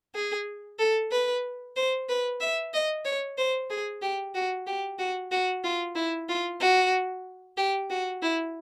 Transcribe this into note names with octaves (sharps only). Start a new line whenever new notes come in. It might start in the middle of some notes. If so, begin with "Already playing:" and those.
G#4
A4
B4
C5
B4
E5
D#5
C#5
C5
G#4
G4
F#4
G4
F#4
F#4
F4
E4
F4
F#4
G4
F#4
E4